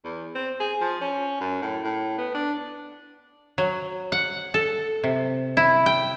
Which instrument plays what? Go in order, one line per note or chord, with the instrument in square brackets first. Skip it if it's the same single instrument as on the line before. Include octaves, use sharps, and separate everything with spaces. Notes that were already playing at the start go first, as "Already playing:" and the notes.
[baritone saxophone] E2
C4
G#4
F3
C#4
F#2
A2
A2
B3
D4
[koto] F#3
F#5
A4
C3
E4
G5